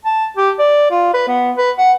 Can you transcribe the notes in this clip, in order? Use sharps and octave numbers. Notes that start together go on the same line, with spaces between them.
A5
G4
D5
F4
B4
B3
B4
F#5